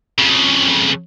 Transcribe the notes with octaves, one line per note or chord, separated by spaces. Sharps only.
F2 C#3